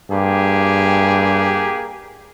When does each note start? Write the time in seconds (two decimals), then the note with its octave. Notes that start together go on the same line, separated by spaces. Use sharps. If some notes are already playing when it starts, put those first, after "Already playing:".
0.11 G2 A#3 G4 G#4